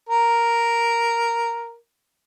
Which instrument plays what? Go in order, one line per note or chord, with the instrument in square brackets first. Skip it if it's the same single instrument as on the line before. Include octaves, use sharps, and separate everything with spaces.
[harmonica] A#4